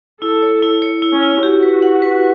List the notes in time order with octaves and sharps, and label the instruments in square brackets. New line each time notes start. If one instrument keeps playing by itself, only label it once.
[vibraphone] E4 [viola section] A4
[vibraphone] C#5
E4
C#5
E4
[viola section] C#4
[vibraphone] E4
[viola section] F#4 [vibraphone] G4
[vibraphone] B4
F#5
B4